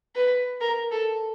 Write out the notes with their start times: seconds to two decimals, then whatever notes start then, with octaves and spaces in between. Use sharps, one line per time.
0.15 B4
0.61 A#4
0.91 A4